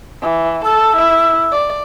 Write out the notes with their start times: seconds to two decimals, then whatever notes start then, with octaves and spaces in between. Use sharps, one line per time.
0.22 E3
0.65 A4 E6
0.97 E4
1.52 D5